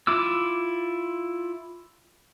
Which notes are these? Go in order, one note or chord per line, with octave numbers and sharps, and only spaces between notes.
E4 F4 D6 E6